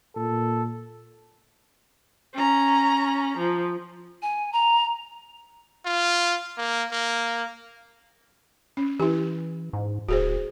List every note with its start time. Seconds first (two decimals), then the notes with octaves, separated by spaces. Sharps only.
0.16 A#2 A4
2.35 C#4 A#5
3.37 F3
4.22 G#5
4.53 A#5
5.85 F4
6.57 A#3
6.91 A#3
8.77 C#4
9.00 E3 E4 G4
9.73 G#2
10.09 D1 F#4 G#4 C5